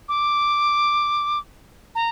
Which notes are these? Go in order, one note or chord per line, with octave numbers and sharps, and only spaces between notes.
D6
A#5